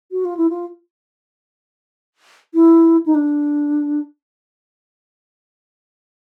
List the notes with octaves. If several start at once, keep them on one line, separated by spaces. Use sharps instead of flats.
F#4
F4
E4
F4
E4
D#4
D4